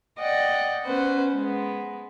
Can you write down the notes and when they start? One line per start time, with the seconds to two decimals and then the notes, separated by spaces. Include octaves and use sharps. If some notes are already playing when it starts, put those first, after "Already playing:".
0.19 D5 D#5 F#5 G5
0.84 B3 C#4 B4 C5 F#5
1.34 G#3 B3